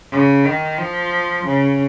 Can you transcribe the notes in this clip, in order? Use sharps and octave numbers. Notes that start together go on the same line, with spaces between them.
C#3
D#3
F3
C#3